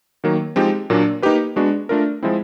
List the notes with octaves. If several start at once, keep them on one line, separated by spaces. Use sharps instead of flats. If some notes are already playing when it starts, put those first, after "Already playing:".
D#3 F#3 A#3
F3 G#3 C4 D#4 G4
A#2 F#3 A#3 D4
A#3 D#4 G4 B4
G#3 B3 D4 F#4
A3 D4 F4 A#4
F3 G#3 C4 E4